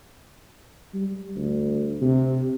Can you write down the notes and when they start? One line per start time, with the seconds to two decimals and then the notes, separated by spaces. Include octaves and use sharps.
0.94 G3
1.36 D2
2.01 C3